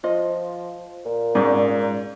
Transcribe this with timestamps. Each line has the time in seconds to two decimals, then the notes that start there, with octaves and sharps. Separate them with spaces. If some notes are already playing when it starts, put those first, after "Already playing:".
0.04 F3 F4 D#5
1.05 A#2
1.35 G#2 C#4 G#4 D5